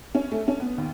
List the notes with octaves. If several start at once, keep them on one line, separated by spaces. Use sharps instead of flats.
C#4
A3
C#4
B3
D#2